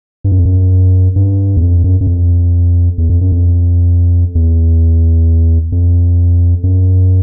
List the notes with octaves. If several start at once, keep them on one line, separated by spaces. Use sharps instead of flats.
G2
F#2
F2
F#2
G2
E2
F2
F#2
F#2
F2
E2
F2
F#2
F2
E2
F2
F#2